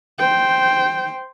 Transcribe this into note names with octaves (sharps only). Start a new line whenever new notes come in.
C5 G5